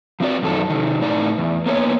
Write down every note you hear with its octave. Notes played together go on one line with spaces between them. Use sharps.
F3 C4 F#4 D5
F#2 D#3 A4
C3 D#3
A2 D#4 D5
E2
A#3 B3 C5 C#5